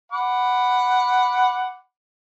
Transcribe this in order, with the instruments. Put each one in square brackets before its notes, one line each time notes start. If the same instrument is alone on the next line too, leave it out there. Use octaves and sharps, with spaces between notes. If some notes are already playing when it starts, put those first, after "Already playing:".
[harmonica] F#5 B5 D6